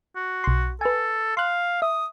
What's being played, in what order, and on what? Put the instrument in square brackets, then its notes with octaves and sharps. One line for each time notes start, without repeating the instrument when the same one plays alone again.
[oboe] F#4
[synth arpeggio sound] B1 C6
[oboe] A4 [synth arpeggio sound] B4 G#5
[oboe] F5 [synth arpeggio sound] C6 F#6
[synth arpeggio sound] E5 [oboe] D#6